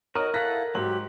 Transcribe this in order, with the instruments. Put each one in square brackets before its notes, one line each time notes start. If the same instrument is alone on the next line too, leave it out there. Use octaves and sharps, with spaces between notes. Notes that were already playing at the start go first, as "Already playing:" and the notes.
[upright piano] D#4 [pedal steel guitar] F#4 D#5 [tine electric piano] A#4 [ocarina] C#5
[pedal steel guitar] E4 A4 F#5 [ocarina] F5 [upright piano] F#6 A#6 B6
[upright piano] G#2 F#7 [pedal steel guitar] F#3 G4 [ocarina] F#4